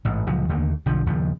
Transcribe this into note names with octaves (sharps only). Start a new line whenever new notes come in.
A1 G#2
C#2 A#2 F3 F#3
D#2 D3 A3 A#3
B1 D3 F3
A#1 D#2 C#3 F3